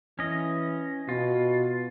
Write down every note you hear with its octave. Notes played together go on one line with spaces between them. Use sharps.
E3 C#4 D#5
B2 F4